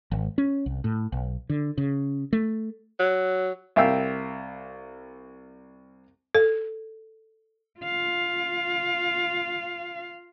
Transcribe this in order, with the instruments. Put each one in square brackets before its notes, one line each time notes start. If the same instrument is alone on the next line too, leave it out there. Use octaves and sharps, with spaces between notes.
[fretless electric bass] G#1
C#4
C2
A2
B1
D3
C#3
A3
[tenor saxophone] F#3
[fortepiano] C2 E5 F5 G5 E6
[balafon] A4
[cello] F4 F5